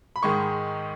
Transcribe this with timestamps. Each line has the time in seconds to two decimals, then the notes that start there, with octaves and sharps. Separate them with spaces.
0.16 B5
0.23 G#2 D#3 G#3 C#6